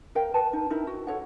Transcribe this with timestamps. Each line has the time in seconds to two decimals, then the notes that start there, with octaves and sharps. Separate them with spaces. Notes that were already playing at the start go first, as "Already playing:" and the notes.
0.15 A#4 F5 G5
0.34 B4 G#5 A5
0.53 D#4
0.70 D#4 E4 A#4
0.87 F#4
1.07 A4 C#5 F#5